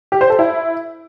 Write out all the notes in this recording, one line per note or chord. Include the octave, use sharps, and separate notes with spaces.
G4
C5
A4
E4